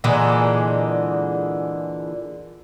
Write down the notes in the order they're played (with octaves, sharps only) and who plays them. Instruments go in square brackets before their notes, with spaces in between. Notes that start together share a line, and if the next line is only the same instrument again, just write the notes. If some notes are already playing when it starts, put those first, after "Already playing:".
[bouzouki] A#2 D3 E3 G#3